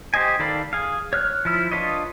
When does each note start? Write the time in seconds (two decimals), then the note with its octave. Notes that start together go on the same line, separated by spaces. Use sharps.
0.14 G4 C5 D#5 G#5
0.39 D#3 A4 D5 F5 B5
0.73 G#4 F5
1.13 C#5 F6 F#6
1.45 F3 E4 F6
1.72 D4 F4 B4 C#5 D#5